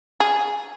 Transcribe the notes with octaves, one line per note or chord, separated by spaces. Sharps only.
G#4